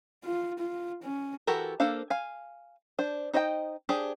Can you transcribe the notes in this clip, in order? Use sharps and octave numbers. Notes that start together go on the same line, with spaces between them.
F4
F4
C#4
E3 F#4 G4 A4 A#4
A#3 D4 A4 C5 F5
F5 G#5
D4 C5
D#4 C5 D#5 F#5 G5
D4 G4 G#4 C5